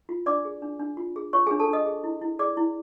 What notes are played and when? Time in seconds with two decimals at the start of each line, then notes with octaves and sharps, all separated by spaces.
0.09 F4
0.26 D4 D5 D6
0.45 G#4
0.62 D4
0.79 D4
0.97 F4
1.16 G#4
1.33 F4 C#5 C#6
1.47 D4 G#4 G#5
1.60 A4 A5
1.69 D4 D#5 D#6
1.86 G#4
2.04 E4
2.22 E4
2.39 G#4 D5 D6
2.57 E4